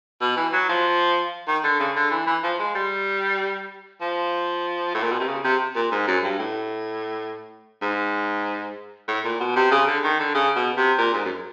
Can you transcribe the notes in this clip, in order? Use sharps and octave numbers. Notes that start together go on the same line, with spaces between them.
B2
E3
F#3
F3
D#3
D3
C#3
D3
E3
E3
F3
G#3
G3
F3
A2
A#2
B2
C3
C#3
C3
A#2
G#2
F#2
G2
A2
G#2
A2
A#2
B2
C3
C#3
D3
D#3
D3
C#3
B2
C3
A#2
G#2
F#2